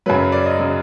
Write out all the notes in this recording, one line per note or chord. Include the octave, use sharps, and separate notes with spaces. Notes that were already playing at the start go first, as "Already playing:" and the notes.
F#2 C#3 F#3 B4
D5
D#5
C#3 F#3